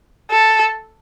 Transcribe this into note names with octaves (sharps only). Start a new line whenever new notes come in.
A4